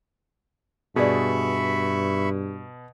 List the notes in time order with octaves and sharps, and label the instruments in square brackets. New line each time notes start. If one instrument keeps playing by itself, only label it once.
[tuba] G2 [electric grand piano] B2 [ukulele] G#4 D5 [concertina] E5 B5 C#6